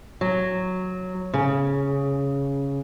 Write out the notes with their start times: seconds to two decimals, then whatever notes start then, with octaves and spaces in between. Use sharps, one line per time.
0.21 F#3
1.34 C#3